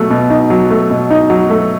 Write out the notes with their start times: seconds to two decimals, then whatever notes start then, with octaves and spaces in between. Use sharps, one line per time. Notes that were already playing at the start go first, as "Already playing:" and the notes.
Already playing: B2 F#3 A3
0.10 B2
0.30 D#4
0.50 F#3
0.70 A3
0.90 B2
1.10 D#4
1.30 F#3
1.50 A3